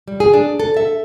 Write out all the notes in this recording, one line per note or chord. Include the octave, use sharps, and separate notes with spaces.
G3
G#4
D4
A4
E5